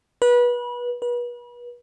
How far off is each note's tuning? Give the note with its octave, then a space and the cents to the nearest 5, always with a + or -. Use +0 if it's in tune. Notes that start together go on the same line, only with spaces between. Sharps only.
B4 -25
B4 -35